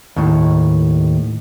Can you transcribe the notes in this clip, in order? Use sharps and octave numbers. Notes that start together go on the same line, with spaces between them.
D#2 A2